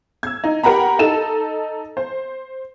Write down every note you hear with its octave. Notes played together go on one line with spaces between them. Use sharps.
E6 G#6
D#4
G4 A#4 F#5 A#5 B5
D#4 A4 E7
C5